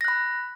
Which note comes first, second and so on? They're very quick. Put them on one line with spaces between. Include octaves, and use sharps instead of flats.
A#6 F#6 B5